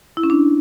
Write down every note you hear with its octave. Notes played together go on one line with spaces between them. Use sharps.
E4
C#4
D4